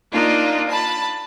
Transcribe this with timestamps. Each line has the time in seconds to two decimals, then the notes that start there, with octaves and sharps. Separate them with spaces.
0.13 A#3 D4 D#4 F4
0.69 A5 B5